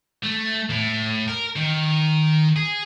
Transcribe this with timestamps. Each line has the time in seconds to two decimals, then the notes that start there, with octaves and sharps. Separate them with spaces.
0.24 A3
0.70 A2
1.28 A#4
1.56 D#3
2.56 G#4